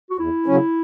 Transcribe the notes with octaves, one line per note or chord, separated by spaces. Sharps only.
F#4
E2 E4
C#3 F#3 C#4